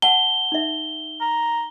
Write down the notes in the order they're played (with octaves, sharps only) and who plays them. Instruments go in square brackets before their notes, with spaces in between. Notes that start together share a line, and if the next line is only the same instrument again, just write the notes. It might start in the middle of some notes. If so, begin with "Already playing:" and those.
[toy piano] F#5 A5 [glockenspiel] G7
[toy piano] D#4 E5
[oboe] A#5